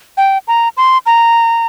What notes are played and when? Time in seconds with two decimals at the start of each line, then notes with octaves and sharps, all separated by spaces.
0.17 G5
0.48 A#5
0.77 C6
1.06 A#5